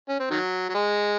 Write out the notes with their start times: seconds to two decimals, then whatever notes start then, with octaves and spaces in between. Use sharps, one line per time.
0.09 C#4
0.20 C4
0.30 D#3 F#3
0.69 F#3
0.74 G#3